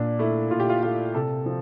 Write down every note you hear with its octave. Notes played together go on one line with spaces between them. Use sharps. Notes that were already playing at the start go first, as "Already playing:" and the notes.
Already playing: A#2 D4
A3 E4
A#2 F4
G4
F4
A3 F4
C3 A4
F3